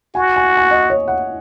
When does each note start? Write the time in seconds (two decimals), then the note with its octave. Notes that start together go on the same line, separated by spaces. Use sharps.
0.15 F#4 G#5
0.36 G#5
0.58 G#5
0.71 D#5
0.90 C#5
1.08 F#5